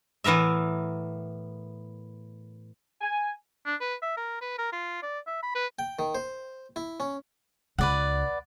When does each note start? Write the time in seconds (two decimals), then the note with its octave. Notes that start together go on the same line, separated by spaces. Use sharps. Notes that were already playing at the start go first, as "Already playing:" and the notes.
0.24 A2 E3 B3 A#4 E5
3.01 G#5
3.66 D4
3.81 B4
4.02 E5
4.17 A#4
4.41 B4
4.58 A#4
4.73 F4
5.03 D5
5.27 E5
5.43 B5
5.55 B4
5.79 G5
5.99 D#3
6.15 C5
6.76 E4
7.00 C#4
7.78 C#2 B4 D5 F#5